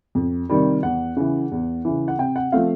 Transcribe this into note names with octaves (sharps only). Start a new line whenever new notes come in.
F2
C3 D#3 G3
E2 F#5
C#3 E3
E2
C#3 E3
F#5
C3 G5
F#5
F3 A3 C4 F5